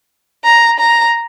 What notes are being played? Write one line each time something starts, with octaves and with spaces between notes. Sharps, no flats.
A#5
A#5